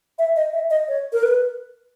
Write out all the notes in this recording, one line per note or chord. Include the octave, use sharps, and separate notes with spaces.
E5
D#5
E5
D#5
C#5
A#4
B4